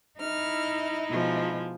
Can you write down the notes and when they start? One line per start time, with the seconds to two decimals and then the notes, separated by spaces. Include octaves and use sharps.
0.19 D#4 E4 F6
1.10 B2 F3 G#3